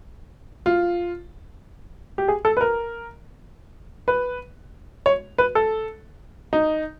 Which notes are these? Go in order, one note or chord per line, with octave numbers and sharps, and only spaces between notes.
F4
G4
G#4
A4
B4
A#4
B4
C#5
B4
A4
D#4